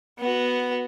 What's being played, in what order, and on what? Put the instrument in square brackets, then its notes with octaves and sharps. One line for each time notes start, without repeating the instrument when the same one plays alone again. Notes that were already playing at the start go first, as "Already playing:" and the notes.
[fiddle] B3 F#4